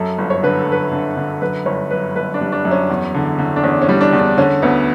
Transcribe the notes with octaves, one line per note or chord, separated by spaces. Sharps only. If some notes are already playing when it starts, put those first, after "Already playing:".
Already playing: F#2 A4
G1
C#5
D3 B4
A4
G1 B4
D3
D3
F#2 B4
G1 C#5
F#2 B4
G1 B4
D4
G3
D4
F#2
C#4
E2
D3
D3
D4
E2 C#4
C#4
G3
D4
E2
D4
D3 C#4
D2 B3